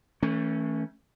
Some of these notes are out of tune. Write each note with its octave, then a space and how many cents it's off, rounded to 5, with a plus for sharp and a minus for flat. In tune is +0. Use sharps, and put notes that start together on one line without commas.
E3 -35 A3 +10 C#4 +0